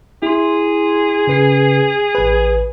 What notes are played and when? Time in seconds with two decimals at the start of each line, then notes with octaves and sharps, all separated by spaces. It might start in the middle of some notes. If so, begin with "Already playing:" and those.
0.22 E4 G#4 C6
1.27 C#3 B4 C7
2.15 A1 B4